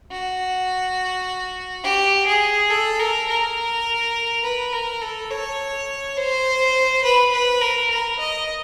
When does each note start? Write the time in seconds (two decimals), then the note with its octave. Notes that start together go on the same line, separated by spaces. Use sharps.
0.11 F#4
1.84 G4
2.27 G#4
2.71 A4
3.00 A#4
3.28 A#4
4.43 B4
4.72 A#4
5.01 A4
5.30 C#5
6.17 C5
7.04 B4
7.32 B4
7.61 A#4
7.90 A#4
8.19 D#5